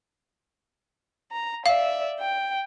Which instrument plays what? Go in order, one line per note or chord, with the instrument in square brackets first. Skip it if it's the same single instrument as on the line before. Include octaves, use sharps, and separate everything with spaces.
[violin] A#5
[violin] D5 E5 [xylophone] F5
[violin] G5